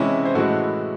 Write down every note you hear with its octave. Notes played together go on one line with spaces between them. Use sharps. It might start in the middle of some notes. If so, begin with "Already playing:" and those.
Already playing: C3 E3 G#3 C#4 E4
C5
A2 E3 G#3 F#4 A4